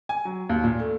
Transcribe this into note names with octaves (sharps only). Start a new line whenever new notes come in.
G#5
F#3
D#2
A#2
A3